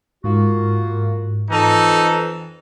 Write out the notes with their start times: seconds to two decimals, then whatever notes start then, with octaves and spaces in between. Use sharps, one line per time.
0.24 G#2 A#3 F4 F#4
1.50 F2 E3 D#4 A4